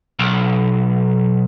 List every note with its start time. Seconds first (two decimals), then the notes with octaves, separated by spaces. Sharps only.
0.19 B1